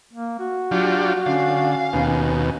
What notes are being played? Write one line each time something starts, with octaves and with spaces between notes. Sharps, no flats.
A#3
F#4
F#3 D4 F4 G4
D3 C#4 F5
D#2 B2